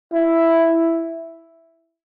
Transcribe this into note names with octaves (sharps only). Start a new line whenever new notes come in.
E4